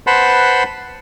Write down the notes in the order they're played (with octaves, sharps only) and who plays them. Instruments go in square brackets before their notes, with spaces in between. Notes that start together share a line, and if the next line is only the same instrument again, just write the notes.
[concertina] B4 C5 F#5 A5 B5 C6